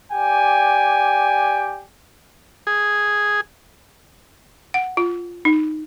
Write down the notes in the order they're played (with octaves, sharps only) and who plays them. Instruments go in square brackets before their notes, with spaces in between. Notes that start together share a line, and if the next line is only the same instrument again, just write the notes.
[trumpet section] G4 D5 G5 G#5
[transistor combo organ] G#4
[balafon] F#5
F4
D#4